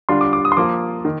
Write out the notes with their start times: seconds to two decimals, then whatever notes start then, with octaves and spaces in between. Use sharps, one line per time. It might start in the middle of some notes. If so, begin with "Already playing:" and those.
0.09 D3 G3 D4 F4 C6
0.21 D6
0.33 D6
0.45 D#6
0.52 C6
0.57 F3 A#3 F4 D6
1.05 D#3